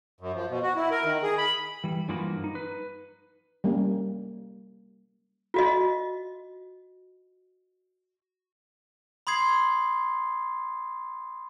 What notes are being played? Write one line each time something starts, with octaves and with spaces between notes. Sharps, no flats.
F#2
F3
B2
F#4
E4
A#4
D#3
G#4
B5
E3 G3
G2 E3 F3 A#3 F#4 B5
D#4
B4
G3 A#3 C#4
F4 F#4 D#5
B5 C6 D#6 G#6 C7